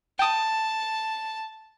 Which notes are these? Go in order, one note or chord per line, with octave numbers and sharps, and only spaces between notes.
G5 A5 D#6